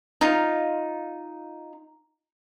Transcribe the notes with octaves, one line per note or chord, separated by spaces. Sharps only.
D#4 F4 F5